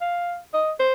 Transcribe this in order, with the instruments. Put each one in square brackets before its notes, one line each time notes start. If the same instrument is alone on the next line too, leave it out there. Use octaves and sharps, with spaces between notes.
[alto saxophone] F5
D#5
C5